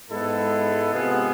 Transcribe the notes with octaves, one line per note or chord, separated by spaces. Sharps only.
G#2 G#3 B3 E4 A4
C3 G#3 B3 F4 G#4